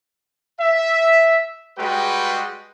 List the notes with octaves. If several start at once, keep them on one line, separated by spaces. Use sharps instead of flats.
E5
G3 G#3 F#4 B4 G5